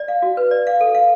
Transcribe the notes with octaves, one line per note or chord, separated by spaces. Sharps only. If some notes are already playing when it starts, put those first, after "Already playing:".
Already playing: D5
F5
F#4
B4
D5
F5
A4
F5